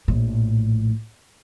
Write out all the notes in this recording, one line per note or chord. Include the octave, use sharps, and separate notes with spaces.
A#1 A2